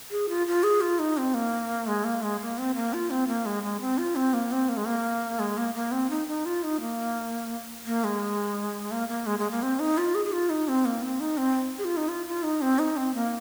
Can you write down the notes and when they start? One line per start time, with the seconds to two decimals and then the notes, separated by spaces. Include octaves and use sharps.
0.11 G#4
0.29 F4
0.47 F4
0.63 G#4
0.81 F4
0.99 D#4
1.17 C4
1.34 A#3
1.87 G#3
2.04 A#3
2.22 G#3
2.41 A#3
2.58 C4
2.75 A#3
2.93 F4
3.10 C4
3.27 A#3
3.45 G#3
3.63 G#3
3.80 C4
3.98 F4
4.15 C4
4.33 A#3
4.51 C4
4.69 A#3
4.77 G#3
4.85 A#3
5.39 G#3
5.57 A#3
5.74 A#3
5.91 C4
6.10 D#4
6.28 D#4
6.45 F4
6.63 D#4
6.80 A#3
7.86 A#3
8.04 G#3
8.91 A#3
9.08 A#3
9.26 G#3
9.39 G#3
9.51 A#3
9.62 C4
9.79 D#4
9.98 F4
10.15 G#4
10.25 G#4
10.32 F4
10.50 D#4
10.68 C4
10.85 A#3
11.02 C4
11.20 D#4
11.37 C4
11.78 G#4
11.84 F4
11.97 D#4
12.08 F4
12.27 F4
12.43 D#4
12.61 C4
12.79 D#4
12.97 C4
13.15 A#3